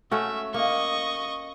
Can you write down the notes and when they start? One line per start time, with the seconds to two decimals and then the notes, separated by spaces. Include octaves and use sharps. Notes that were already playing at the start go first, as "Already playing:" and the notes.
0.11 A3 C#4 F#4 E5
0.54 A#3 D#5 C#6